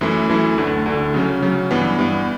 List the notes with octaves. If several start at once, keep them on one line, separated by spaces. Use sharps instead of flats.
F#2 E3 A3 E4
F#2 E3 A3 E4
D2 D3 A3
D2 D3 A3
C#3 F#3 C#4
C#3 F#3 C#4
G2 E3 B3
G2 E3 B3